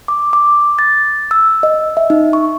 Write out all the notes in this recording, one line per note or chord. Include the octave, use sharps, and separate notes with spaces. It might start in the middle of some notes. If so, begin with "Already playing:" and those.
D6
D6
A6
E6
D#5
E5
D#4
C#6